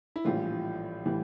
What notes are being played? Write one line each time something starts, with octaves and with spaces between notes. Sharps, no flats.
E4
A#1 A2 E3 G3 F4
A2 E3 G3